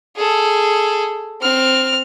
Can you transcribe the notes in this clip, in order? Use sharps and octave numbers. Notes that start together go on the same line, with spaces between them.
G#4 A4
C4 F6